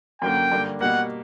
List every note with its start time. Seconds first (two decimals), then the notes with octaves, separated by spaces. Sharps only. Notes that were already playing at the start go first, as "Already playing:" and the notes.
0.22 F#2 D3 A#3 G5
0.52 G2 D3 A#3 D4
0.81 B2 G3 A#3 F#5